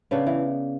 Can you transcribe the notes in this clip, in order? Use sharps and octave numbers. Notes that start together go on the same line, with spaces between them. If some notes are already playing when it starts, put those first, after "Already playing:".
C#3 B3 D4
E3